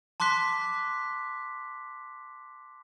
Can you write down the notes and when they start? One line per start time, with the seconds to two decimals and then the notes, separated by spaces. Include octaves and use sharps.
0.20 A5 C6 D6 F#6 B6